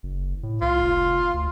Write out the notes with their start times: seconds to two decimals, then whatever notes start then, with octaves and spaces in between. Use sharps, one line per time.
0.03 F#1
0.43 A2
0.61 C2 F4
0.83 F1
1.34 D2